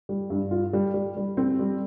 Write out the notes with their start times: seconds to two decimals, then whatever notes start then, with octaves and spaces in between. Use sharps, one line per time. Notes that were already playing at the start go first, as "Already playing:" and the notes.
0.09 G3
0.30 G2
0.51 F4
0.73 G3
0.94 G3
1.17 G3
1.37 C4
1.59 G3